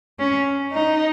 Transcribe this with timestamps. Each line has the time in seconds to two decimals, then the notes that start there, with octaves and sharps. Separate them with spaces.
0.19 C#4
0.72 D#4